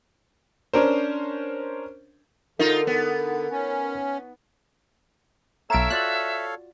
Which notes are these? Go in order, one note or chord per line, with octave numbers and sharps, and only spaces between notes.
C#4 D4 A#4 C5
D3 D#4 F4 A#4
B3
C#4
B1 A4 C#5 E5 F5 A#5 D7 E7
F4 F#4 D5 F#6